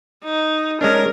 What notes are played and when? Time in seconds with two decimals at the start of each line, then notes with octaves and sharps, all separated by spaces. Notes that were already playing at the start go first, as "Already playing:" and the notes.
0.24 D#4
0.81 G#3 C#4 D4 A#4